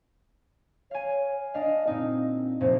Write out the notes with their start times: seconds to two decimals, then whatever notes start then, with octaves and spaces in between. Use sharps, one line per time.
0.91 C#5 F5 G#5
1.54 D4 D#5 F5
1.87 A#2 C4 D#4
2.61 F1 A#2 C5